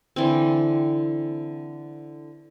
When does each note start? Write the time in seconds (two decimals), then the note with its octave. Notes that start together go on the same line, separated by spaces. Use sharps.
0.16 D3 E3 C4